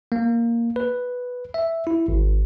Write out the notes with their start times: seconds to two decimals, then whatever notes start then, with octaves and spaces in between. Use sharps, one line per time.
0.12 A#3
0.76 B4
1.54 E5
1.87 E4
2.08 G#1